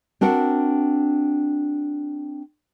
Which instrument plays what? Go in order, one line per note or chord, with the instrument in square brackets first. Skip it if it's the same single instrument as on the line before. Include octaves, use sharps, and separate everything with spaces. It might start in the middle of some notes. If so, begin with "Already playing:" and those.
[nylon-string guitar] C4 D4 F#4 A#4 F#5